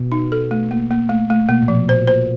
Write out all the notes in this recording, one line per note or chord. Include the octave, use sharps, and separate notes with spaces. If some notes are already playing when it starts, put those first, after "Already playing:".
Already playing: B2
D#4
A4
A3
A#3
A#3
A3
A3
B2 A#3
A#2
F3
B2
A#2 C5
C5